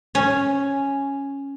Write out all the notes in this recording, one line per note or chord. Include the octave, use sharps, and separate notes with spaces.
C#4